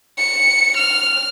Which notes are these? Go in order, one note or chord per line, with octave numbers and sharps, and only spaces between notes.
C#7
F6